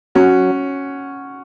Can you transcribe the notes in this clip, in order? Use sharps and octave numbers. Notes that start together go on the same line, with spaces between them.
F#3 C#4 F#4